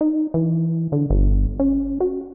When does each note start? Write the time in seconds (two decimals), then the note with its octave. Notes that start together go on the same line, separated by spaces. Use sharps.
0.01 D#4
0.34 E3
0.92 D3
1.10 G1
1.60 C#4
2.00 F#4